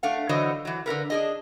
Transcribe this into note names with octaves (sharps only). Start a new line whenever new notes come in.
A3 D4 F5 F#5
D3 E3 F#3 C5 D#5
E3 F#3
D3 F4 A#4 B4
D4 G#4 D#5